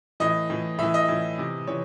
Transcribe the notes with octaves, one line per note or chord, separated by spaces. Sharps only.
A2 E3 D#5
A2 E3
A2 E3 E5
D#5
A2 E3
C3 E3
C3 E3 C#5